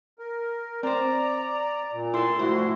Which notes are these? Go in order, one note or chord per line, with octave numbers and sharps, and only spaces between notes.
A#4
C4 C5 D5 A#5
A#2
E4 A4 C6
C2 A2 F3 E4 F#4 C5